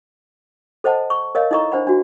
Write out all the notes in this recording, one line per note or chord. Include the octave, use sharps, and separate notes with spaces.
A4 C5 D#5 F#5 A5
C#6
A#4 C#5 D#5 F5
D#4 E4 A4 D#5 A#5 C#6
D4 C5 F#5 B5
D4 F#4